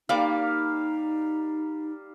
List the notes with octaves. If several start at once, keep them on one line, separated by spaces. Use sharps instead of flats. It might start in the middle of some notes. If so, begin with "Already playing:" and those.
G3 A#3 D#4 D5 F5 D6